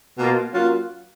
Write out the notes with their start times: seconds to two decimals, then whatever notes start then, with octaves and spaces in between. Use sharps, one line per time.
0.18 B2 A#3 F4
0.54 F#3 A#3 C#4 F4